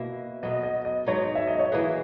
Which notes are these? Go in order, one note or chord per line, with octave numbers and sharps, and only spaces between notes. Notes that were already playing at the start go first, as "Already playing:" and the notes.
Already playing: B2 A#3 E4 B4
B2 F#3 B3 D#5
D#5
D#5
G#2 F#3 B3 D#4 C#5
E5
D#5
C#5
E3 A#3 D#4 G#4 B4